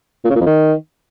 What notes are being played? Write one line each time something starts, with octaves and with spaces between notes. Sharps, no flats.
A#2
C#3
A#2
F2
D#3